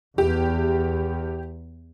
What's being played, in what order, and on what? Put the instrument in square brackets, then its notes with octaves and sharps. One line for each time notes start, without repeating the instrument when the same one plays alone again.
[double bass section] E2 [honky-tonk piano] G4